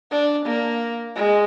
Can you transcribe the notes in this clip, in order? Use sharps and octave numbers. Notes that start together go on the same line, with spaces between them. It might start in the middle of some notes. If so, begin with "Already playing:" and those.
D4
A#3
G#3